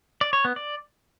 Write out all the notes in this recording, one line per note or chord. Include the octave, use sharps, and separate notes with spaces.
D5
C#5
B3
D5